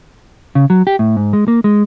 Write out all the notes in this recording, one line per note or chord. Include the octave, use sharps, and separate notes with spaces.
C#3
F#3
G4
A2
G#2
G#3
A#3
G#3